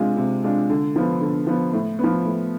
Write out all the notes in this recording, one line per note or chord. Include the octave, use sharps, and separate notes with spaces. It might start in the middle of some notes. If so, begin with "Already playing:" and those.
Already playing: C3 G#3 D4 F4
C3
G#3 D4 F4
D3
F3 B3
D3
F3 B3
A2
F3 B3
A2